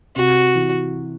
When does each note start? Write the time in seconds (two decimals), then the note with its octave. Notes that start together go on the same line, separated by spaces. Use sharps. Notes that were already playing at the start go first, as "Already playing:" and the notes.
0.16 C3 F#4
0.55 E3